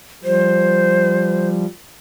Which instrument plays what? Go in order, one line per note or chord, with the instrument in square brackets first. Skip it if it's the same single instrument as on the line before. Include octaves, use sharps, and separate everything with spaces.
[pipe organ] F3 G3 [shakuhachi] C5